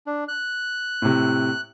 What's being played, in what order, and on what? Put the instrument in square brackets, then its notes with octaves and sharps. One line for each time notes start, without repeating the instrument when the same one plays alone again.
[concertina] D4
F#6
[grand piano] A2 C3